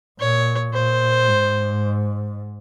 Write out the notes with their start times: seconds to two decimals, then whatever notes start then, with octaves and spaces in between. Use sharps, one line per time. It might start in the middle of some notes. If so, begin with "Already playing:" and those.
0.19 A#2 C#5
0.73 A#2 C5
1.28 G#2